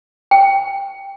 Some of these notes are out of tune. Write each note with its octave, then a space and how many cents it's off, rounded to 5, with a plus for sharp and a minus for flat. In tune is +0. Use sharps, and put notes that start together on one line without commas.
G5 +5